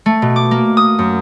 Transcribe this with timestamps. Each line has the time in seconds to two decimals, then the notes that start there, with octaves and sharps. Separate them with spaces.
0.06 A3
0.22 B2
0.36 D6
0.51 A#3
0.77 D#6
0.99 F#2